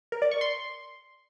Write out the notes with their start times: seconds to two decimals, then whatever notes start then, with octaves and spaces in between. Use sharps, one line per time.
0.12 A#4
0.22 D5
0.31 C#6
0.41 C6